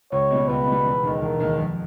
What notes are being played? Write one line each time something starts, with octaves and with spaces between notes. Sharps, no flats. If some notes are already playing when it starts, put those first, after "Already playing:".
C#2 C#5
B2 G3
C#2 B4
B2 G3
E1
D#2 D#3 G#3
E1 A#4
D#2 D#3 G#3
F2